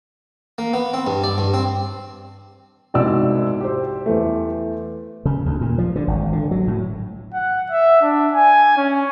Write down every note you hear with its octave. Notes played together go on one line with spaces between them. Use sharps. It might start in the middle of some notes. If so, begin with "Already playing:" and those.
A#3
B3
C4
G2
D5
G2
C4
C2 G#2 B2 F#4 D5 E6
G4 C5
E2 A3
C#3
D2
A#2
F3
D3
G#1
D3
F#3
A2
F#5
E5
D4
G#5
C#4